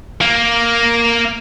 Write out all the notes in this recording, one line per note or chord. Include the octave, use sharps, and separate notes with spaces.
A#3